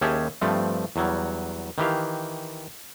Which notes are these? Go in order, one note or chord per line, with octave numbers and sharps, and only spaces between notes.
D#2 C#4 G4 G#4 E5 A5
G2 F3 A3 C4
E2 F#3 G3
D#3 E3 G4 F5